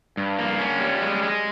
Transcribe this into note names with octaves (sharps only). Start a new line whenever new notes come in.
G2
A#3
C#4
G3
G#3
G#3